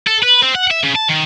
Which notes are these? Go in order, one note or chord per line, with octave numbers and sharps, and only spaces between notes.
A4
B4
C4
F#5
E5
C#3
A5
D#3